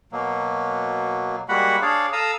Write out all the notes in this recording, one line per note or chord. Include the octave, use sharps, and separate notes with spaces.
B2 F#3 A#3
G3 G#3 A#3 F#4 F#5 B5
D4 G#4 C#5 D5 F5
A4 F5 A#5 D#6 E6